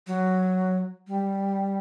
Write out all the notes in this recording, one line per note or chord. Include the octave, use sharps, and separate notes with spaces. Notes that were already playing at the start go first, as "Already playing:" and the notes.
F#3
G3